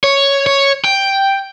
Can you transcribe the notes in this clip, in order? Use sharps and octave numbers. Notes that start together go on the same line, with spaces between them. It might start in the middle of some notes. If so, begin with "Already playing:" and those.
C#5
C#5
G5